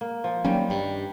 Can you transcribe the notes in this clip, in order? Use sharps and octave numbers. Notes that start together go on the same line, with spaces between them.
A#3
F3
D#3 F#3 G3 A#3 C#4
G2